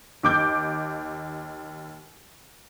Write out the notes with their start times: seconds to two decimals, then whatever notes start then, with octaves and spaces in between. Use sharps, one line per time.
0.23 D#2 D6 G6